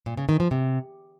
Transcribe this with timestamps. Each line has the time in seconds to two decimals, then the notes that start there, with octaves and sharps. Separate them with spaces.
0.06 A#2
0.17 C#3
0.29 D#3
0.40 F3
0.51 C3